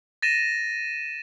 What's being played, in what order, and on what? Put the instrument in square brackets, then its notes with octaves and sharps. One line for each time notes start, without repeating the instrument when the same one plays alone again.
[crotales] A6 A#6 D#7 E7